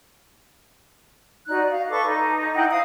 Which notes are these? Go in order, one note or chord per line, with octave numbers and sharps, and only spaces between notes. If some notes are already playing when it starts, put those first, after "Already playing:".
D#4 F#4 D5 F#6
F5
A4 B4 C#6 D6
D#4
D#4 E4 F#5 G5
C5 F5 D#6